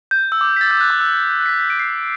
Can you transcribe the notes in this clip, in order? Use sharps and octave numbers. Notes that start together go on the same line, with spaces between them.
G6
E6
D6
B6
A6
G6
F#6
D6
E6
F#6
F#6
B6
A6
B6
D7
C7